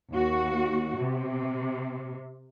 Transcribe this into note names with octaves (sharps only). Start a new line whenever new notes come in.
D#2 F#4
C3